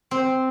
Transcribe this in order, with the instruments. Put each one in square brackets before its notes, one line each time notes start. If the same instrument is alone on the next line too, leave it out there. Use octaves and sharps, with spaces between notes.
[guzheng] C4